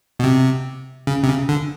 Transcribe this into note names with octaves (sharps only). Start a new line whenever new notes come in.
B2
C3
C#3
C3
C#3
D3